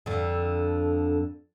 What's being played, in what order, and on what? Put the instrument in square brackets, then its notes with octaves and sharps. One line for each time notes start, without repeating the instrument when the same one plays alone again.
[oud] F2 D3